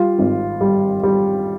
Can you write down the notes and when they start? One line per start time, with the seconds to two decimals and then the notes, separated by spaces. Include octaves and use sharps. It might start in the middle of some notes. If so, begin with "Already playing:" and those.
Already playing: G3 F4
0.19 G#1
0.61 G3
1.03 G3